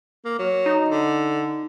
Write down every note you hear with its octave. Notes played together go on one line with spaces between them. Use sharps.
A#3
F#3
D#4
D3